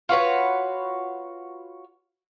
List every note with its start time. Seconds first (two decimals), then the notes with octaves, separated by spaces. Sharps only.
0.09 F4 F#4 B4 C#5